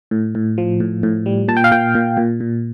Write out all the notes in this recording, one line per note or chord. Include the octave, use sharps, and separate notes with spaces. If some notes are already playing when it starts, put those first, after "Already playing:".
A2
A2
F3
A2
A2
G3
A#2 A5
G5
F5
A#2 G5
A#2
A#2
A#2